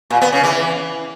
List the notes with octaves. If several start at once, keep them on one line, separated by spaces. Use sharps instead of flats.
A#2
B3
C#3
E3